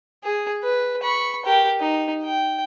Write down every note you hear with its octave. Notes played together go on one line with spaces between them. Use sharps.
G#4
B4
B5 C#6
G4 A#4
D#4
G5